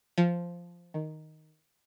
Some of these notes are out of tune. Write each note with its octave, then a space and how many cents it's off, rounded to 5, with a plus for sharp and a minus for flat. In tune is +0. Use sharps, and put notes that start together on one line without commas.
F3 -5
D#3 +0